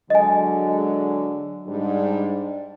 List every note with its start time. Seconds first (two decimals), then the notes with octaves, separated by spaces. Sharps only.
0.10 D3 F#3 G#3 D#5 G#5
1.67 G#2 G3 D4